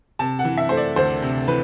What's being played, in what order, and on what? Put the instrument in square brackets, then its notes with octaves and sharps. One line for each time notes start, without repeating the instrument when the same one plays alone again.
[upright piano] C3 A5
F#5
E3
E5
A3 C5
D5
D2 C5
C3
E3 B4